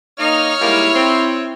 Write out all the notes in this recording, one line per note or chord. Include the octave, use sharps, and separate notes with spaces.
A#3 D#4 C#5 F6
G3 G#3 A#3 E4
C4